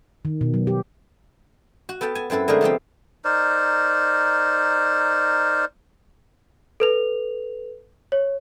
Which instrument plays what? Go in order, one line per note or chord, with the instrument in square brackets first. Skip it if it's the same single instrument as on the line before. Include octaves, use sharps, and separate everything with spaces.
[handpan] D#3
B2
F#3
G4
[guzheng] F#4
B3 A4 G5 A5
G#5 A5
F#2 C4 E4 A4 B4
D3 G#3 A3 G#4 A#4 C5
C3 F3 B3 C4
[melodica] D#4 A#4 C5 D5
[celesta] A4 B4 F7
C#5